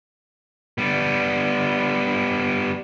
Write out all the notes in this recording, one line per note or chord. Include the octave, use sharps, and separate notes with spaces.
G3 B3